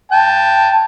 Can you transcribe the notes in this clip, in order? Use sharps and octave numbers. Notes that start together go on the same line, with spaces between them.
G5 A5